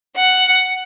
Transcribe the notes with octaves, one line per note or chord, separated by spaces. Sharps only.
F#5